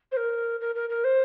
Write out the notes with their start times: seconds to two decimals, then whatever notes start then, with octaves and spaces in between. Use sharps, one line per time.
0.12 C5
0.17 A#4
0.61 A#4
0.75 A#4
0.90 A#4
1.04 C5